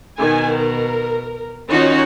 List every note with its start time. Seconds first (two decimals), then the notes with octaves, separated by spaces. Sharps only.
0.19 B2 D#3 G#5
0.57 A#4
1.69 D#3 C#4 D#4 F4 F#4 C#5